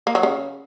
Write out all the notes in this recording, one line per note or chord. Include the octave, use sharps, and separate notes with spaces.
A#3
F#3
C#3